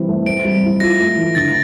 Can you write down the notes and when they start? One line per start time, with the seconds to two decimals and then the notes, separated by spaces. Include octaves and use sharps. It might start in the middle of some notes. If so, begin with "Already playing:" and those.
Already playing: E3 G3 C4
0.08 A3
0.26 C4 D7
0.44 G3
0.63 E4
0.80 F4 A#6
1.00 A3
1.17 E3
1.35 D3 A6